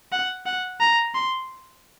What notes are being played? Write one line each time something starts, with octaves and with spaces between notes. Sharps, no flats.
F#5
F#5
A#5
C6